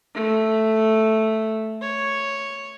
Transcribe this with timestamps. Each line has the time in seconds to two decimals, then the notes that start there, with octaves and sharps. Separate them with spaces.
0.15 A3
1.81 C#5